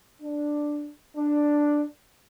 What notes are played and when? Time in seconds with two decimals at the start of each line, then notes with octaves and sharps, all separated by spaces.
0.22 D4
1.17 D4